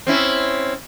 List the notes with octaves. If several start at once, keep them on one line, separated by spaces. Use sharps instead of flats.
C4 C#4 E4